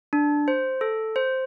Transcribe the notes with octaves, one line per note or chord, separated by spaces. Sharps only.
D4
C5
A4
C5